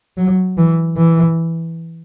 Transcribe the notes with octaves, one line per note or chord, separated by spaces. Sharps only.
F#3
E3
E3